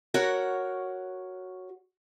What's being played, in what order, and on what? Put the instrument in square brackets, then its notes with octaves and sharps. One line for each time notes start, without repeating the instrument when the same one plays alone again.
[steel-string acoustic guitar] F#4 A#4 C#5 F#5